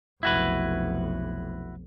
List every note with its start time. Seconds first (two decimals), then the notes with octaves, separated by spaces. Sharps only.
0.23 F1 B1 E4 F#4 B4